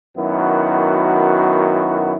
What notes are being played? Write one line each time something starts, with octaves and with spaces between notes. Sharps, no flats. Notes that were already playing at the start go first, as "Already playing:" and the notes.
F#2 D#3 B3 E4 F#4